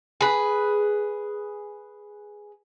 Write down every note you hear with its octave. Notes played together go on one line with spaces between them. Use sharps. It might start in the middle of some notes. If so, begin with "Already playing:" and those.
G#4 B4